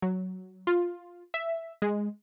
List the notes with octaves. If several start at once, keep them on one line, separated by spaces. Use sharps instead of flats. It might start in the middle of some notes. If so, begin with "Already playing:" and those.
F#3
F4
E5
G#3